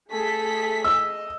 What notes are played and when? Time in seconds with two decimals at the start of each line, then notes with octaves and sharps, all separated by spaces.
0.11 A3 G#4 A4 B6
0.84 D#5 E6